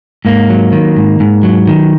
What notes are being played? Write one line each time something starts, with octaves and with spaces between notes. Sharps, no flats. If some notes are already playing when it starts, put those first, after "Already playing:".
G#2 A#3
F#3
D#3
G#2
G#2
F#3
D#3